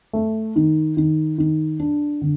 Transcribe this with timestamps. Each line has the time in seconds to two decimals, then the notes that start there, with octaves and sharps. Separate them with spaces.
0.13 A3
0.56 D#3
0.97 D#3
1.38 D#3
1.80 D4
2.21 D3